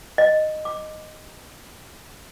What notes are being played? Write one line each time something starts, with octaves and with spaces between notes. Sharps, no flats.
D#5
D6